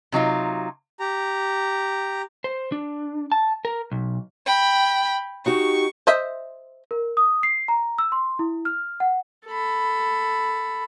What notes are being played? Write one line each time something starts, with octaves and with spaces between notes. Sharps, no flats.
C3 F#3 D#4 F4
G4 A#5
C5
D4
A5
A#4
B1
G5 B5
D#4 F#4 G4 C#6
C5 D#5 E5
A#4
D#6
C7
A#5
E6
C6
E4
F6
F#5
A4 B5